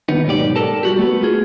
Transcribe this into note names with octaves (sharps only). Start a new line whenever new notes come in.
D#2 B3 D#4
B1 G#2 G4 D5
A4 A#4 A5
G3 F#4 G4
A3 B3
F4 G#4